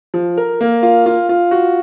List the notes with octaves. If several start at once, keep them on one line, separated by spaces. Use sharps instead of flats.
F3
A#4
A#3
F4
F4
F4
F#4